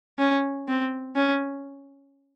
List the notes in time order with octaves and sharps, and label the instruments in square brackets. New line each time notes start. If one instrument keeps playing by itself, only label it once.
[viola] C#4
C4
C#4